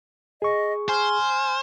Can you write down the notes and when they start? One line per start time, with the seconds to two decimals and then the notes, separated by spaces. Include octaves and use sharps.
0.42 G#4 D#5 C#6
0.89 C5 G#5 F6